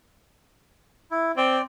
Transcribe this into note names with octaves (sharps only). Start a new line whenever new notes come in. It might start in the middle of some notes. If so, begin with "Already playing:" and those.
E4
C4 D5 G5